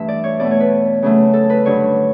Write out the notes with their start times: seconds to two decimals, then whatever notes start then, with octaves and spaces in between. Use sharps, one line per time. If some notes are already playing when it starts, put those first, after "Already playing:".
Already playing: G2 E3 A3 E5
0.08 D5
0.24 C#5
0.40 B2 A3 D5
0.51 C#5
0.60 B4
1.02 C#3 F#3 A3
1.33 A4
1.50 B4
1.65 G2 D3 F#3 C#5